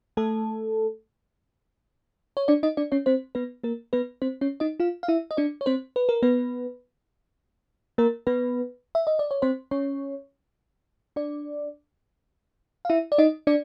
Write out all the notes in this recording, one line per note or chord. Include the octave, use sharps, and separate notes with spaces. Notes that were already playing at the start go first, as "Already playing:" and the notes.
A3 A4
C#5
D4 D5
D#4 D#5
D4 D5
C#4 C#5
C4 C5
B3 B4
A#3 A#4
B3 B4
C4 C5
C#4 C#5
D#4 D#5
F4 F5
F5
E4 E5
D#5
D4 D5
C#5
C4 C5
B4
A#4
B3 B4
A#3 A#4
B3 B4
E5
D#5
D5
C#5
C4 C5
C#4 C#5
D4 D5
F5
E4 E5
D5
D#4 D#5
D4 D5